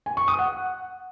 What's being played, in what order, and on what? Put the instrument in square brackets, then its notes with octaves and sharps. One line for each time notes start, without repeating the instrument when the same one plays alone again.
[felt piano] G#5
C#6
D#6
F#5